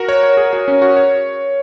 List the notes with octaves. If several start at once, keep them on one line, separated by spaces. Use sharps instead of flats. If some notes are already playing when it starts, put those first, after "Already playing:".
Already playing: F#4 A#4
C#5
C#5
G#4
F#4
C#4
F#4
C#5